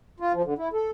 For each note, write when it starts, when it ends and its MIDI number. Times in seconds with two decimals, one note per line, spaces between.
0.20 0.33 65
0.33 0.42 53
0.44 0.54 50
0.58 0.69 64
0.73 0.91 69